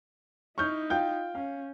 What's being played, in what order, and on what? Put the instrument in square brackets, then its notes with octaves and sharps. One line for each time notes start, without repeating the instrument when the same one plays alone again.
[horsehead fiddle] D#4 E4 [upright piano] C#6 F6 G6
[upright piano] F4 G5 G6
[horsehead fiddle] C#4 [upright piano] F5